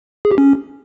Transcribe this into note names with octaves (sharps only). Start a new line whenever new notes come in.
G#4
G4
C#4